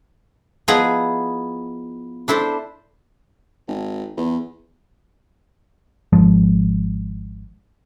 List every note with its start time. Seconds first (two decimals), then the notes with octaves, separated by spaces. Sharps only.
0.68 F3 B3 D#4 E4 G#4 A#5
2.28 D4 E4 A4 C5
3.68 G#1
4.17 E2
6.13 G#1 F3 G#3